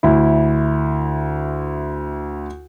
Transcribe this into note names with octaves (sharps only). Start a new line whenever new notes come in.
D2 E4